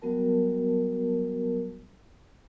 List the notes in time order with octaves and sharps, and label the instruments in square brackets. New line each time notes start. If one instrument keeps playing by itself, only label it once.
[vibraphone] F#3 G3 B3 F#4 A#4 A5